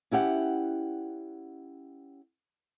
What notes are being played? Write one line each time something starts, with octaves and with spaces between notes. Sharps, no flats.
C#4 E4 G4 F#5